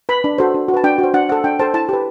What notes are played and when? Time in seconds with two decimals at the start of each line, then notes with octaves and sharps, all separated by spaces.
0.09 B4 B5
0.24 D4
0.38 F#4 A4 C5
0.54 D4
0.68 F#4
0.74 B4 A5
0.84 D4 G5
0.98 F#4
1.03 C5
1.14 D4 F#5
1.29 A4 C5 F#5
1.44 D4 G5
1.59 A4 C5 A5
1.74 E4 A5
1.89 G4 B4